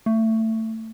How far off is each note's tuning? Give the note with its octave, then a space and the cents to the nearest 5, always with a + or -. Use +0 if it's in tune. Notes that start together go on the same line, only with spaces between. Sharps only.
A3 +20